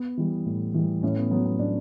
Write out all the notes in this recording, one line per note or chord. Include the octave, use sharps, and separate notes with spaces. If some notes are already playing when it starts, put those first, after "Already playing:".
Already playing: B3
E3 G3
A2
E3 G3
A2 C#4
B3
F#3 B3
B3
A2 D4